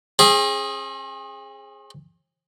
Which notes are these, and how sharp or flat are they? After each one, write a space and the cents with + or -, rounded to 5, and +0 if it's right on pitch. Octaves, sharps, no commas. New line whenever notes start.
C4 +45 G#4 +0